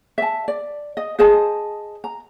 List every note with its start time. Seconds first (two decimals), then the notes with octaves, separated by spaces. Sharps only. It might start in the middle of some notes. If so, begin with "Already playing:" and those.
0.18 E5 A5
0.48 D5
0.97 D#5
1.19 G#4 C5 D#5 A5
2.04 A#5